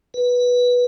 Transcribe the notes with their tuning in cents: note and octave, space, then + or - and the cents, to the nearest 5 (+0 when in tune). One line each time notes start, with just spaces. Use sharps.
B4 -10